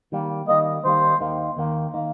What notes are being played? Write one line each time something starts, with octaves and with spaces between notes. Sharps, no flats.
D#3 G3 A#3
D#3 G3 A#3 D#5
D#3 G3 A#3 C5
D#2 D#3 A#3
D#2 D#3 A#3
D#3 A#3